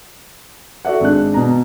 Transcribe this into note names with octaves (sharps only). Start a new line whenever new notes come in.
F#4 A4 D5 E5 F#5
G#1 G#3 D4 F#6
B2 A#5